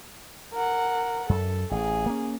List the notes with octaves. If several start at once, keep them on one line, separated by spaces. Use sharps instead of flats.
A#4 F#5
F#2 A4
A1 G#4
A#3 C#4